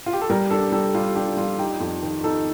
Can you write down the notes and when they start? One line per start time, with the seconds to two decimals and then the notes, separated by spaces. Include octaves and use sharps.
0.06 F4
0.13 G4
0.21 A4
0.30 G3 A#4
0.50 D4 A4
0.72 G3 A4
0.94 G3 F4
1.15 D4 G4
1.37 G3 F4
1.59 D#4 G4
1.80 F2
2.02 D#3
2.24 D#4 A4